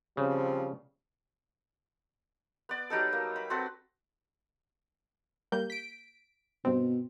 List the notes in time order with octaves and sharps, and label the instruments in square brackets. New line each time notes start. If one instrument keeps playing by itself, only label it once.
[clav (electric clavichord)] C#3 [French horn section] F3 G3 C4
[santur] B3 D5
F#3 G3 D#4 A4
A#3
B5
C4 F#4 A4 B4
[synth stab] G3 A#3 G6
B6 D7
[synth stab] G2 C4 [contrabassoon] B2